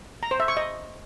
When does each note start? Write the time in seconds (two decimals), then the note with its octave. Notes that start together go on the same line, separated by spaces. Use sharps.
0.23 A#5
0.31 C5
0.40 E5
0.48 C#6
0.57 D#5